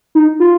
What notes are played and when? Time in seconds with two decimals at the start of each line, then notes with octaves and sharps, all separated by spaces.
0.15 D#4
0.40 F4